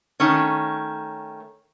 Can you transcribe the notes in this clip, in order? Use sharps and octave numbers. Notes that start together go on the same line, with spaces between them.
D#3 A3 C#4